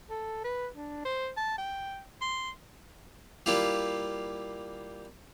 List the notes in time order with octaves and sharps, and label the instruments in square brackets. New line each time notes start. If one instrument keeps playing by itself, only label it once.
[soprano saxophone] A4
B4
D4
C5
A5
G5
C6
[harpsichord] G3 A#3 E4 F4 G4